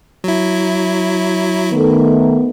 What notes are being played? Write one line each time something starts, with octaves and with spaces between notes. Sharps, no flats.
F#3 E4
D#3 A3 B3